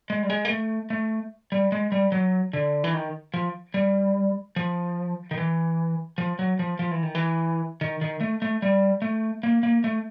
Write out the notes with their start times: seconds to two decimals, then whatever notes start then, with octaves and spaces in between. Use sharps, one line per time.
0.10 G#3
0.23 G3
0.30 G#3
0.45 A#3
0.50 A3
0.90 A3
1.52 G3
1.72 G#3
1.92 G3
2.12 F#3
2.53 D3
2.84 E3
2.93 D#3
3.34 F3
3.74 G3
4.56 F3
5.31 D#3
5.38 E3
6.18 F3
6.39 F#3
6.59 F3
6.79 F3
6.91 E3
7.03 D#3
7.15 E3
7.81 D#3
8.01 D#3
8.21 A3
8.42 A3
8.62 G3
9.02 A3
9.43 A#3
9.63 A#3
9.84 A3